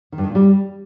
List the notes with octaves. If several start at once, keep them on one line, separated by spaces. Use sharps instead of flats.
D#3
G2
D#3
A#2
G3